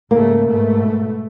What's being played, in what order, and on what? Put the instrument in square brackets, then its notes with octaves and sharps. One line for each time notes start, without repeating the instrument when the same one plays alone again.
[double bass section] G#2 C#3 A3 [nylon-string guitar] A#3
[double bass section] G#2 B2 A3